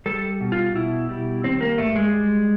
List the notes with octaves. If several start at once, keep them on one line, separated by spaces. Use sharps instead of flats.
G3 A4
B2
F4
B2 E4
G3
D#3 C4
A#3
G2 A3
G#3
G3